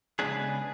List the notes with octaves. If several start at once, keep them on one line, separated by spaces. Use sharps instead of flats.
C#3 G#3 B3 D4 G#4 B4